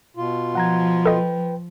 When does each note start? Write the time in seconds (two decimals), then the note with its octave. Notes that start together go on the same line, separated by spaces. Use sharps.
0.17 B2 F4
0.55 F3 F#5 A#5 G#6
1.05 A4 B4 D#5 G5